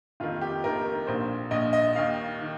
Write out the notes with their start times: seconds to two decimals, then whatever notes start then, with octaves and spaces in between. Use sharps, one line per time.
0.20 F1 D#2 D#3 F4
0.41 G4
0.64 F1 D#2 D#3 A#4
1.07 A#1 A#2 C5
1.51 A#1 A#2 D#5
1.73 D#5
1.95 D#2 D#3 F5
2.42 D#3